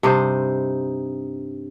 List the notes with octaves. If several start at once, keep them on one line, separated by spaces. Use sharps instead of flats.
G2 C3 D#4 C5